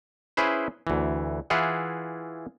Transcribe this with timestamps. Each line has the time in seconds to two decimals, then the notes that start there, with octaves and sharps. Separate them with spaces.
0.37 C#4 E4 G#4 B4 C5
0.87 D2 E3
1.50 E3 E4 F4 G#4 F#5